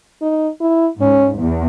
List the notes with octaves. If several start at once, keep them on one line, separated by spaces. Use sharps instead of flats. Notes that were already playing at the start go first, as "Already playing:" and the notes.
D#4
E4
G#2 C#4
E2